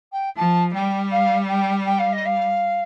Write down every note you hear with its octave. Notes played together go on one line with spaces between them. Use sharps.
G5
F3 A5
G3 G5
F5
G5
G5
F5
D#5
F5